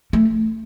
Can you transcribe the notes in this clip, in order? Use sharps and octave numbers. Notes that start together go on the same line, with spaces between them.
A3